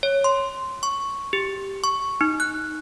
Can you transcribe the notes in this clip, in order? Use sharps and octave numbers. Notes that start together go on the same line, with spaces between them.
C#5
C6
C#6
G4
C#6
D#4
F#6